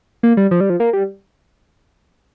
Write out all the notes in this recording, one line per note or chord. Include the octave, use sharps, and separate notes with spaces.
A#3
G3
F3
G3
F3
A#3
G3